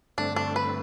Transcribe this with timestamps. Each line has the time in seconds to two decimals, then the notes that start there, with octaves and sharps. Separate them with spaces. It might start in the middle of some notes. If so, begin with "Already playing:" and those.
0.18 G2 D3 A3 C4 D4
0.36 D4
0.56 B4